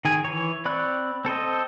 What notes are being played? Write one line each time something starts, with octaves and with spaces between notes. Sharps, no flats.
D#3 G#4 G#5
E3 C#5
C4 D5 B5 C#6 F#6
C4 A4 C5 D#5